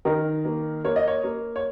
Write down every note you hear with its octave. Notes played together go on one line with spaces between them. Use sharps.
D#3 A#4
A#3
A#3 C#5
D#5
C#5
A#3
C#5